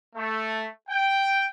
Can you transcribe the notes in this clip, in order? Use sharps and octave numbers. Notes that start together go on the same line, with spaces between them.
A3
G5